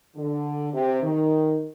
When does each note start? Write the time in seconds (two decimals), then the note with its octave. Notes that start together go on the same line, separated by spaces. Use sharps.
0.16 D3
0.74 C3
1.02 D#3